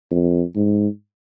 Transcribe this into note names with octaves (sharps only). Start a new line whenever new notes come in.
F2
G#2